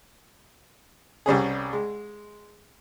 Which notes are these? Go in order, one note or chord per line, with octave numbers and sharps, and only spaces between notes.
C2 G3 C#4 G#4
G#3